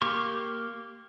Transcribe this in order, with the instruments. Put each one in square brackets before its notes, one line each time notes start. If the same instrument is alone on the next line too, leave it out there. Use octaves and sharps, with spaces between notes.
[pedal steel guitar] A#3 G4 C#6